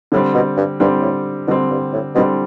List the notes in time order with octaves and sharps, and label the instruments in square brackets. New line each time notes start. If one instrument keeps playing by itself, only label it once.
[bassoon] A2 [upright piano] D3 G3 C4
[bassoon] B2
G2
[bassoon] G2 [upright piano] D3 G3 C4
[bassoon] A2
[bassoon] B2 [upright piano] D3 G3 C4
[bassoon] G2
A2
[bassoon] B2 [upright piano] D3 G3 C4